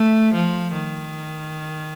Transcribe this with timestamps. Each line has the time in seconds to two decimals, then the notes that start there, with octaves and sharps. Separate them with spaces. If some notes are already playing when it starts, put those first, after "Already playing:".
Already playing: A3
0.34 F3
0.73 D#3